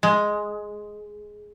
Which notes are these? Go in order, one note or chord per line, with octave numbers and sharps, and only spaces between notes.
G#3